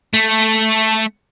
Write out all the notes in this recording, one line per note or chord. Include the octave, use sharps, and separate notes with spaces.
A3